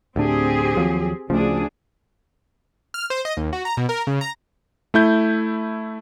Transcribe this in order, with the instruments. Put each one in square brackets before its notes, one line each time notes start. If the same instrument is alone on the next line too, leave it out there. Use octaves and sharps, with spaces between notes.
[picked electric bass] D2 A2 D4 [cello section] C4 G4 G#4
[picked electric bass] D#2 F3 F#3
[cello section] D2 D4 G#4 [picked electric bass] C#3 F3
[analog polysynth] F6
C5
D#5
D#2
F#4
A#5
B2
A#4
C#3
A#5
[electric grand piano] A3 E4 G6